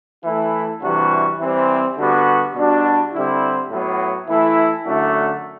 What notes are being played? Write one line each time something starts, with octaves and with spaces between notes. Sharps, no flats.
E3 A3 E4
C3 E3 G3 D4 F#4
E3 G3 C4
D3 G3 B3 F#4
B2 G3 D4 F#4
D3 G3 C4 E4
A2 F#3 B3
E3 A3 E4
F#2 D3 A3 D4 F#4